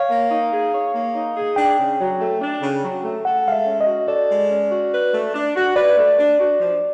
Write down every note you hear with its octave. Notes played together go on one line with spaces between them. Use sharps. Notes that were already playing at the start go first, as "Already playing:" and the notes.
Already playing: C#5 F5
A#3
D#4
G#4
C#5
A#3
D#4
G#4
D4 G5
C#3
F#3
A3
D4
C#3
F#3
A3
A4 F#5
G#3 F5
E5
C#4
D#5
F#4
A4 D5
G#3
C#4
F#4
B4
A3
D4
F#4
B4 D5
A3
D4
F#4
F3